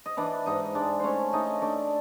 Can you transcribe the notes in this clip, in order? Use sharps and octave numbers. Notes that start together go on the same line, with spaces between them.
D#5
E3 D4 D5
G#2 D#4 D#5
G#3 D4 D5
A3 C#4 C5 C#5
A3 D#4 D#5
A3 D4 D5